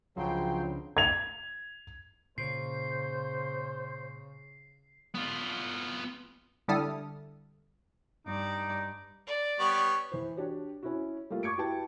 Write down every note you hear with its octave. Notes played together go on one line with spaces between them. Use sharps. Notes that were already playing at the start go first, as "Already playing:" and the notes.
C#2 C#3 F3 F#3 D4 G5 C6
G#6 F7
A#2 C#3 C5 C7
B3 F4
D3 G3 E4 A4 D#6 F6
G2 D#4 D5
D5
G3 B3 C#5
E3 C5
D4 F#4 G4 C#5
C#4 E4 F#4
G3 A3 A#3 F4
C#6 D6 G#6 C#7 D7
E4 F#4 G4 B4 G5 A5